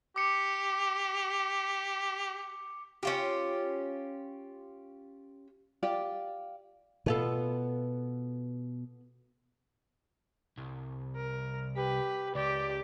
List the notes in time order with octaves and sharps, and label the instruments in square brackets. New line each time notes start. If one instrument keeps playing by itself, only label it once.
[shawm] G4 [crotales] D6 C#7
[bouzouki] C#4 F4 G4
[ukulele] F4 G4 D5
[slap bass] B2 [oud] B3 F4 A4
[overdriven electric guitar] C2
[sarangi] A#4
[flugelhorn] G4 [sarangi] B4
[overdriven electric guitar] C#2 [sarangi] G4 [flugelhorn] D5